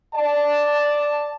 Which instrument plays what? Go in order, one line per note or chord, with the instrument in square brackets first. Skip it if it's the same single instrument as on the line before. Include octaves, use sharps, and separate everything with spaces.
[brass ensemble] D5 A5